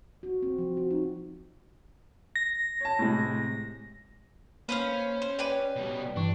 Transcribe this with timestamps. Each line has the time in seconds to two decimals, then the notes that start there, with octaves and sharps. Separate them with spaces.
0.23 F#4
0.42 C4
0.59 F3
0.77 F#4
0.90 D#4
2.36 A#6
2.81 C#5 A5
2.99 A2 C3 G#3
4.69 A#3 C#4 B4 C5 F5
5.22 C5
5.39 G4 B4 C#5 D5 G#5
5.76 B2 G3
6.16 G2 E3 D4 C#6